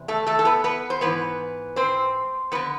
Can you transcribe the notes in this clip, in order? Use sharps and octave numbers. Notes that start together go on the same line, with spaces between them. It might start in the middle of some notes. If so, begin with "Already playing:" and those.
Already playing: E2 C3
A3 A4
A3 A4
A4
B3 B4
B3 B4
C5
G#2 E3 B3 B4
C4 C5
F2 D3 B3 B4